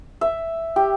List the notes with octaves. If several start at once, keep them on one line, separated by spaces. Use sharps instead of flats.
E5
G4